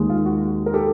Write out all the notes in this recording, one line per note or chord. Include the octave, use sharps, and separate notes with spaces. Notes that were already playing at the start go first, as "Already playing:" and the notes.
Already playing: D#2 D#3 G#3
F4
F#4
A#4
G4 A4